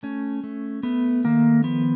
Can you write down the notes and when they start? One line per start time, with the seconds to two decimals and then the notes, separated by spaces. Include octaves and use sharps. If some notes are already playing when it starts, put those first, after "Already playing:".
0.03 A3 C#4
0.44 A3
0.83 A3 B3
1.24 D#3 A#3
1.64 F3 B3